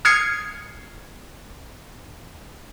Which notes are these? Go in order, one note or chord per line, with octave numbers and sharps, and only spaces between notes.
D#6 F6 G#6 C7 C#7